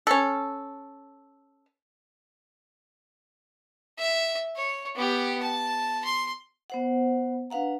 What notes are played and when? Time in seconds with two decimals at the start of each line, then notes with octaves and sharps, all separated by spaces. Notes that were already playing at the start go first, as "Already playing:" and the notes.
0.07 C#4 A4
3.98 E5
4.56 C#5
4.96 B3 G4
5.42 A5
6.04 C6
6.70 B3 C5 F#5
7.50 D4 B4 F5 F#5 A#5